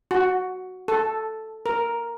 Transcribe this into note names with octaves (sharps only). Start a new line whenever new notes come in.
F#4
A4
A#4